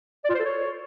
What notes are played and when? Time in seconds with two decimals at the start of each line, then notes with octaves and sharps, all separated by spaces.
0.24 D5
0.29 F4
0.34 C5
0.40 A4
0.45 C#5